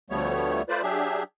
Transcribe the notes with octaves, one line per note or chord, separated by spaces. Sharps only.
D2 F3 G3 A3 B3 C#5
A3 F4 B4 C5 D5
F#3 D4 G4 G#4 E5